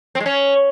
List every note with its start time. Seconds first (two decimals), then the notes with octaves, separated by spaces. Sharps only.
0.15 C4
0.20 G#3
0.26 C#4